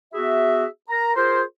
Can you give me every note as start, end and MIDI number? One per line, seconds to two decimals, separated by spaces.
0.14 0.65 59
0.14 0.65 66
0.14 0.65 68
0.14 0.65 76
0.90 1.14 70
0.90 1.14 82
1.16 1.42 65
1.16 1.42 68
1.16 1.42 70
1.16 1.42 72